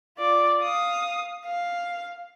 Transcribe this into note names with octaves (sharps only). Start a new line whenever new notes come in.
F4 D5
F5 D#6
F5